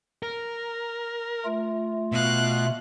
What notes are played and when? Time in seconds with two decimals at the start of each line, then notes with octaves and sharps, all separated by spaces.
0.23 A#4
1.45 A3 F4
2.12 B2 F5 F#6